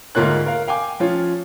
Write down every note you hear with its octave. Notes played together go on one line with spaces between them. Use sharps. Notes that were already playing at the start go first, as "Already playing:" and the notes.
D2 G#2 A#3 F4 C#5 F#6
A#4 F5
F5 G5 G#5 D6
F3 C#4 F4 C#5